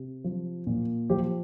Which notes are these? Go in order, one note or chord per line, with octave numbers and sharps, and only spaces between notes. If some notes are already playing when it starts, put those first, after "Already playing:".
Already playing: C3
F3
A#2
F3 G4